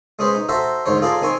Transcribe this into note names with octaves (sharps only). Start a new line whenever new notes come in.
G#3 C#4 G#4 B4 C5
D#4
F#4 A4 C5 E5 A#5 C6
D2 G#2 D#3 C5 C#5
F4 G#4 A4 D5 A#5 C6
D#3 C4 G#5 C6 C#6